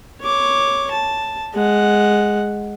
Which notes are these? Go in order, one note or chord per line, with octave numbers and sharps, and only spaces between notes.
C#5 D6
A5
G#3 F#5